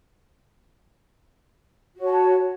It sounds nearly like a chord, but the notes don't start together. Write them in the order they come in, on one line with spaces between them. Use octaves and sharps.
F#4 C#5 A5